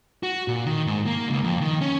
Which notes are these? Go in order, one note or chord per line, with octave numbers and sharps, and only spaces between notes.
F#4
A#2
D#3
G#2
A#3
C#2
F2
D#3
C#4